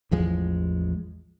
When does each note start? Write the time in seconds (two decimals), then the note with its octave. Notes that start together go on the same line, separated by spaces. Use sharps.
0.11 A1 E2 F3 G#3